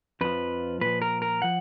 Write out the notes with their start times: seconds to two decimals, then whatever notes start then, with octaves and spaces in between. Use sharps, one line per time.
0.21 F2 F3 B4
0.81 A#2 F3 B4
1.02 A#4
1.22 A#4
1.42 F3 F#5